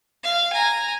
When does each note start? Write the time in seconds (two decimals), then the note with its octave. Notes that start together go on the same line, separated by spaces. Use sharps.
0.24 F5
0.53 G#5 A#5